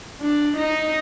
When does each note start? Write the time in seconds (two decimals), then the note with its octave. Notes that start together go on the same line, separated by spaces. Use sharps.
0.21 D4
0.57 D#4